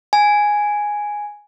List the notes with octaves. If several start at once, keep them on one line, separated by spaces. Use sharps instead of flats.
G#5